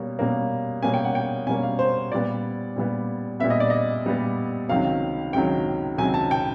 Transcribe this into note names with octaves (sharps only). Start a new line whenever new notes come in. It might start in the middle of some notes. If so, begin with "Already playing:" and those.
Already playing: B2 G3 A#3 C#4
B2 G3 A#3 C#4
B2 G3 A#3 C#4 G#5
G5
F#5
G5
B2 G3 A#3 C#4 G#5
F5
C5
A#2 G3 B3 D5
A#2 G3 B3
A#2 G3 B3 E5
D#5
D5
D#5
A#2 G3 B3
C#2 C3 D#3 F#3 F5
C#2 C3 D#3 F#3 G5
C#2 C3 D#3 F#3 G#5
A5
G5